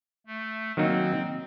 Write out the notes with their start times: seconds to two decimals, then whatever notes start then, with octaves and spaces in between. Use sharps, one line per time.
0.27 A3
0.77 D#3 F#3 A#3 C4 D#4